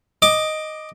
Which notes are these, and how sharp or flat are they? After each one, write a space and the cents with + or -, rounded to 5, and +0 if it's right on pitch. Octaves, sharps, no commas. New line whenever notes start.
D#5 +0 D6 +10